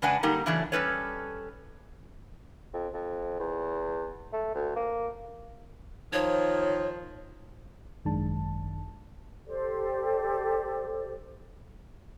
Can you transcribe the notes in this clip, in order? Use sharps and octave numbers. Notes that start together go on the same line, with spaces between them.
C#3 G#3 D4 B4 F#5 G#5
D3 G3 A#3 D#4 G4 A#4
C#3 E3 F#3 A3 C#4 D4
G3 A3 C#4 A4 B4 C#5
F2
F2
E2
A3
D2
A#3
D#3 F3 C#5
G#1 F#2 D#3 G#3 D4 A5
G4 A4 C5 D5